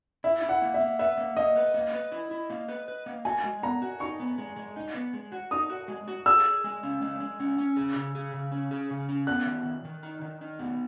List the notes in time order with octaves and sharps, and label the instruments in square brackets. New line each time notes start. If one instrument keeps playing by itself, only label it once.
[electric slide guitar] E4 [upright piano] E5
[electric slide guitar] E4
[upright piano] F#5
[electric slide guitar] A#3
[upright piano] E5
[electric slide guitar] A#3
[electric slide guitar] B4 [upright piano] E5
[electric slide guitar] A#3
[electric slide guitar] A#3 [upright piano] D#5
[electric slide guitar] B4
A#3
B4
E4
E4
A#3
B4
B4
A#3
[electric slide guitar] F#4 [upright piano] G#5
[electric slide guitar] G#3
[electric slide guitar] B3 [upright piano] A#5
[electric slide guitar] F#4
[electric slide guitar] D#4 [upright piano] C#6
[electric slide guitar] B3
G#3
G#3
D#4
B3
G#3
F#4
[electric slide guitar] D#4 [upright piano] D#6
[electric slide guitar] F#4
G#3
F#4
[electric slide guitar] G#4 [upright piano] E6
[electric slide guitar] G#4
G#3
C#4
G#3
G#3
C#4
C#4
G#4
C#3
G#4
C#3
C#4
G#4
C#3
C#4
[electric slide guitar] B3 [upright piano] F#6
[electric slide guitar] D#3
D#3
D#3
D#4
D#3
D#4
B3